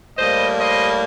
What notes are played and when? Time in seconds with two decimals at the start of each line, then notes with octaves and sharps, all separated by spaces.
0.17 A2 G3 A#3 C5 D#5
0.58 C5 D#5